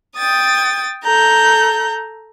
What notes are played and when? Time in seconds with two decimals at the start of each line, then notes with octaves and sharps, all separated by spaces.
0.16 G5 D#6 A6
1.04 A4 A#5 G6